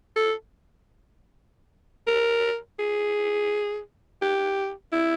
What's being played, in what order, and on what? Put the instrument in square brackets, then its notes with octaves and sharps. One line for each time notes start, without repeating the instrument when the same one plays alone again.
[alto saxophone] A4
A#4
G#4
G4
E4